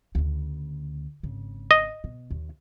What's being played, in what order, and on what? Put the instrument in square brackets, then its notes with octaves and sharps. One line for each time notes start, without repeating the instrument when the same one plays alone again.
[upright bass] D2 C#3
G#1 C#3
[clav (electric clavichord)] D#5
[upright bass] B2
D#2